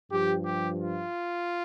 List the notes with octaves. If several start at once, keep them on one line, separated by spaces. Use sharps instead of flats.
G2 F3 G4
G4
F4